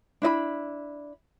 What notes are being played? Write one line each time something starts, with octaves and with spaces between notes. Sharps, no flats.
D4 E4 D#5 B5